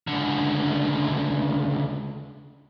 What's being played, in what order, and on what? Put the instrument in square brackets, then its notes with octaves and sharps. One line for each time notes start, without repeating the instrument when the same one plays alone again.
[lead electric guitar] C#2 D3